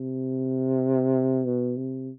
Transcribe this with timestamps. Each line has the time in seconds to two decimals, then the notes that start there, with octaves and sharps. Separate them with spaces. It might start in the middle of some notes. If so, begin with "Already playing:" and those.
Already playing: C3
1.45 B2
1.77 C3